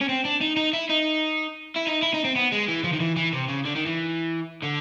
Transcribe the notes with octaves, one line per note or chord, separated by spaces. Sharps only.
C#4
C4
D4
D#4
D#4
E4
D#4
E4
D#4
E4
D#4
C4
B3
G#3
E3
F3
D#3
E3
E3
C3
C#3
D3
D#3
E3
D3